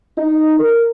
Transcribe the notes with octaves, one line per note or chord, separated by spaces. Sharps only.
D#4
A#4